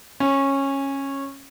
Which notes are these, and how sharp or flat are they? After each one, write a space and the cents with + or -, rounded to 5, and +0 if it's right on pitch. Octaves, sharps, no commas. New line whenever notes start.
C#4 -15